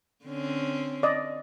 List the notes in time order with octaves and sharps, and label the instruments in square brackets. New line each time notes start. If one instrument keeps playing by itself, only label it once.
[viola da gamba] D3 C4 C#4
[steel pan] D5 D#5